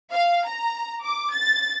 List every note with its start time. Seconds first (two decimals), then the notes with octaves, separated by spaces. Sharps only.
0.12 F5
0.46 A#5
1.03 D6
1.34 A6